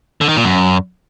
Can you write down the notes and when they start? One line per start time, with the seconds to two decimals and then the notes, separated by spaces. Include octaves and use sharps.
0.21 D3
0.29 D#3
0.37 A#2
0.44 F#2